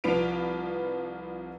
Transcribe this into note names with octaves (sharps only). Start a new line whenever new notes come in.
C2 F3 F4 B4 D7 F7